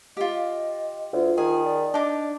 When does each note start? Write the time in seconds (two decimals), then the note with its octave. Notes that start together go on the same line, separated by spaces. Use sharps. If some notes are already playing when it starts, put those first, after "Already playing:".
0.17 F4 G4 D#5
1.13 D2 F4
1.38 D#3 G#4
1.65 D5
1.94 D4 D#4 D6